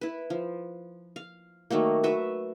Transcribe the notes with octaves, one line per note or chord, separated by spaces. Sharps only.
E4 B4
F3
F5
D#3 F#3 A3 A#3
F#4 B4 E5